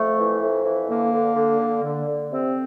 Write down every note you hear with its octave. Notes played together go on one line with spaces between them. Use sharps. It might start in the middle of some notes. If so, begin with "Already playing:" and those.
Already playing: F2 A3
E3
F2
E3
D3 A#3
D3
D3
D3
D3
D3
C3 C4